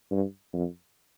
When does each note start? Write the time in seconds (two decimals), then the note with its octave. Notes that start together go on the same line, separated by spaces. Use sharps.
0.11 G2
0.53 F2